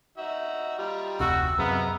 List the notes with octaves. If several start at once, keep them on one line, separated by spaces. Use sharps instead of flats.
D#4 F#4 E5
G3 D#4 F4
F1 D2 C3 F#4 E6
F#2 C3 G#3 B3 F5 A#5